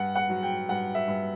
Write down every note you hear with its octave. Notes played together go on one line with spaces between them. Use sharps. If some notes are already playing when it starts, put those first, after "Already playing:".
Already playing: G2 F#5
F#5
F#3
G5
G2 F#5
E5
G2